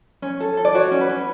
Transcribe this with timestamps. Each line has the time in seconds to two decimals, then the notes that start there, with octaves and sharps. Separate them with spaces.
0.22 C#4
0.40 A4
0.57 A4
0.65 D5
0.74 F#4 C#5
0.91 C#4
1.01 B4
1.09 C#4